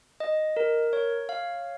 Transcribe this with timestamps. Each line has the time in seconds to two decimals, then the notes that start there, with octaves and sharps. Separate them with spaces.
0.20 D#5
0.57 A#4
0.93 C#5
1.29 F5